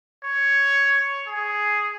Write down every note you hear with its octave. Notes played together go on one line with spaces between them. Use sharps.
C#5
G#4